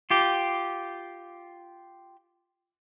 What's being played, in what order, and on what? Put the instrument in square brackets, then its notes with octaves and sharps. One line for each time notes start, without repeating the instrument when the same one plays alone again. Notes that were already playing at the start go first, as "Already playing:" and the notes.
[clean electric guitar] F4 G4